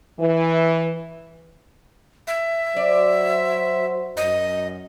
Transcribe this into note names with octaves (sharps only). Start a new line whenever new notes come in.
E3
E5
F#3 F#4 C5 D5
F#2 D#5